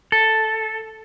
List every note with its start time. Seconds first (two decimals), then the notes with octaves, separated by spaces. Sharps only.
0.12 A4